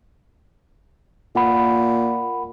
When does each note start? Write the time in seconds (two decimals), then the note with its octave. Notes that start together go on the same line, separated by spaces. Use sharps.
1.35 A#2 A#4 F#5 B5